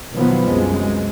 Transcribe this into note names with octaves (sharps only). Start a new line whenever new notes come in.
B2 D#3 F3 F#3 B3
C2 F#2 G#3